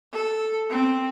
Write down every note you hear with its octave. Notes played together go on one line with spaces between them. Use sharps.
A4
C4